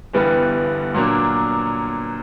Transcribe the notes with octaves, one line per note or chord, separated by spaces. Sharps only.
G1 G2 E3 G3 B3
A#2 F#3 A#3 D4